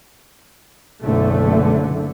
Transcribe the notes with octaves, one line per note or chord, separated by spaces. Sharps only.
F#1 B1 F#2 D3 A3